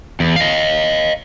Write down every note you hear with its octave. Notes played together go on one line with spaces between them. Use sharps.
E2
D#5 F5